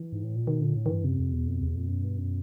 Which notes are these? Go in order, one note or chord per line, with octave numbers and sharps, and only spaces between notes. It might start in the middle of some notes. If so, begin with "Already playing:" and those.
Already playing: E3
G#2
A2
A#2
B2 D#3
A#2 D3
A2
D#3
G2 E3
F#2 C3
F2
E2 B2
F2
E2 C3
B2
F2 A#2
F#2 B2
G2
F#2